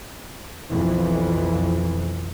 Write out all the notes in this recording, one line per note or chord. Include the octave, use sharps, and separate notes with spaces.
B1 F2 E3